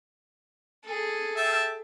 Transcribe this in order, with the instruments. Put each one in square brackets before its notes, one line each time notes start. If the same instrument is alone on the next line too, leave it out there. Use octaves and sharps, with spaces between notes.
[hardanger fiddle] G#4 A4
[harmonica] E5 G5 A5